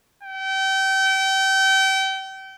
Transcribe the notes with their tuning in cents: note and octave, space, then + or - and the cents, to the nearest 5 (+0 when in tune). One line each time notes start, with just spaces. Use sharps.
G5 -30